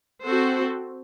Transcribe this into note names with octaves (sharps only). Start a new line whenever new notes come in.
C4 F#4 A4 C5